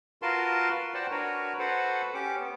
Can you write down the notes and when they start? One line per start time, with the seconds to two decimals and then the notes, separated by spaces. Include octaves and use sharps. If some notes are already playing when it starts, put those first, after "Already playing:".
0.22 F4 F#4 A#4 B4 A5 C6
0.94 F#4 C5 D5 F#5 G5 A5
1.11 D4 F#4 A#4 B4 C#5
1.59 F#4 A4 B4 C5 F#5
2.14 C#4 G4 D6
2.40 B3